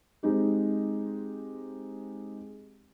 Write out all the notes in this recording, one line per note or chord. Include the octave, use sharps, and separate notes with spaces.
G#3 C4 D#4 G4